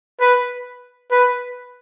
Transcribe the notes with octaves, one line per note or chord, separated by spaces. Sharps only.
B4
B4